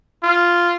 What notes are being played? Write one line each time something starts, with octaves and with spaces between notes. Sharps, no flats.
F4